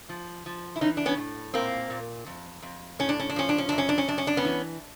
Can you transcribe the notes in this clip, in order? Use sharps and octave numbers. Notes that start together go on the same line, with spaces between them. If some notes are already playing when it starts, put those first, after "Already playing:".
F3
F3
E4
E3 C#4 D#4
D4
B3 C#4
A2
A#2 A#3 C4
A#2
F2
F2
A2 C#4
D4
C#4
D4
F3 C#4
D4
C#4
F#2 D4
C#4
D4
C#4
F#2 D4
C#4
D4
B3 C#4
E3